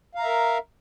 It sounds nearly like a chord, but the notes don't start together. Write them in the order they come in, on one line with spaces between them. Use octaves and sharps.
F5 A#5 E5 A#4